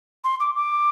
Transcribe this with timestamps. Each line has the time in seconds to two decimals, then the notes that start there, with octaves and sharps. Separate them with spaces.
0.24 C6
0.40 D6
0.55 D6